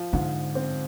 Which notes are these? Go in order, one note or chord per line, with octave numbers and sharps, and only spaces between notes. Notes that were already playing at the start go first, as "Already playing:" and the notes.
Already playing: F3 F4
G#2 D3
C4